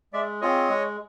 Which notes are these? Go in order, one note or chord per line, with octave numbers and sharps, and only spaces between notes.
G#3 D5 E5
C4 F4 G#4 C#5 D#5
G#3